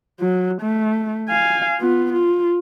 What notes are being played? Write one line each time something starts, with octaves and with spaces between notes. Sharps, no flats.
F#3
A3
F5 G#5
B3 F4
F4